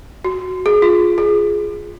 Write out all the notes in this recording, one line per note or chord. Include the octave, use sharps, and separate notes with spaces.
F#4
G#4
F4
G#4